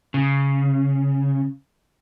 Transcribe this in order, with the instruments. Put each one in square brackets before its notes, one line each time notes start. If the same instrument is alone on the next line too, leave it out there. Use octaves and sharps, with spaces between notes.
[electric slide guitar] C#3